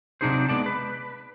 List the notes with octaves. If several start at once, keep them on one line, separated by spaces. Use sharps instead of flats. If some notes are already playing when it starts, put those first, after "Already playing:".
C3 F#3 D4 D#4 G#4 C5
G#3 B3 D5 A5
B4